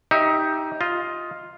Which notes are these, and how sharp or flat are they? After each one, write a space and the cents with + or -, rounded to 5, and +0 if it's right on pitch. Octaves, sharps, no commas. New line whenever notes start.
D#4 +15 G4 +0 E5 +0
F4 +0 D#5 +15